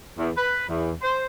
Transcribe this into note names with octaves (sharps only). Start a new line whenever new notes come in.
E2
B4
E2
C5